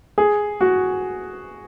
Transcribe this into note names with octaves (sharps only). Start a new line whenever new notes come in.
G#4
F#4